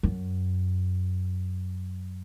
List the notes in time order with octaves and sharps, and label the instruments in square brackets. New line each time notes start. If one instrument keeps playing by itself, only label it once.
[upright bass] F#2